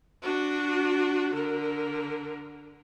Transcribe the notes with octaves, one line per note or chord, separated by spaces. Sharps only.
D4 F#4
D3 A#4